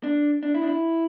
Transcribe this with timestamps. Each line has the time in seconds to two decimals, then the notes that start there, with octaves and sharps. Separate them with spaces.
0.03 D4
0.43 D4
0.54 E4
0.62 D4
0.67 E4